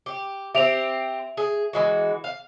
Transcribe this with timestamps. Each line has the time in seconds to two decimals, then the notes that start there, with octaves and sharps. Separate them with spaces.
0.06 G4
0.55 C4 G4 E5 D7 F7
1.37 G#4
1.73 E3 G#3 F#4
2.24 F5